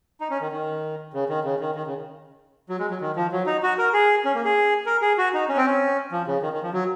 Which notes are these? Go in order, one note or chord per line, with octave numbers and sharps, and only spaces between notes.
D#4
C#4
D#3
D#3
C#3
D#3
C#3
D#3
D#3
C#3
F#3
G#3
F#3
D#3
F3
F#3
D#4
F#4
A#4
G#4
C#4
A#3
G#4
A#4
G#4
F#4
D#4
C#4
C4
C#4
F3
C#3
D#3
D#3
F3
F#3